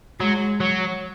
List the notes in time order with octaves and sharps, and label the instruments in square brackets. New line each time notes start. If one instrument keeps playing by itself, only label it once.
[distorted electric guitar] F#3 [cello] G#3
[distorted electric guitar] F#3